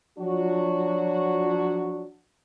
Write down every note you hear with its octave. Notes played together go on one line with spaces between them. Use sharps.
F3 F#3 D4 F#4